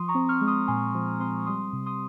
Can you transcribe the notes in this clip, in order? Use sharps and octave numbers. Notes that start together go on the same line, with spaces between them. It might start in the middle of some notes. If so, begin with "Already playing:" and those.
Already playing: F3 C6 D#6
A#5 C#6
C4
C#6 F6
G#3
C6 D#6
A#2 G#5 C6
F3
C4 C6 D#6
G3 C6 D#6
C3
C6 D#6